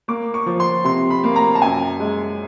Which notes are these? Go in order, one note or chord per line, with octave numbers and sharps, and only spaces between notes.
A#3 D6
C#6
F3
C6
C3 C6
B5
A#3
A#5
A5
F#2 G#5
G#3